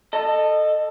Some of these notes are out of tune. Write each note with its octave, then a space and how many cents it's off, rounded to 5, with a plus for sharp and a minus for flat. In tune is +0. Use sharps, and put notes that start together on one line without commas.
A4 +5 D#5 -20